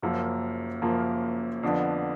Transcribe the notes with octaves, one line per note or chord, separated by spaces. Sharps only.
F#1 F#2 F3 A#3 F4
F#1 F#2 F3 A#3 F4
F2 D3 F3 B3 D4